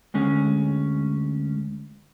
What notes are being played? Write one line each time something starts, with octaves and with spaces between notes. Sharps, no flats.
D2 G#3 C#4